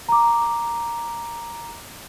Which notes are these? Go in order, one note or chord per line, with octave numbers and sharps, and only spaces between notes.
A#5 D6